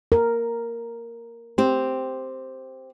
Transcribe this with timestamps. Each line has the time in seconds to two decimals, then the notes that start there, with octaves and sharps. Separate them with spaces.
0.12 A#4
1.58 C4 G4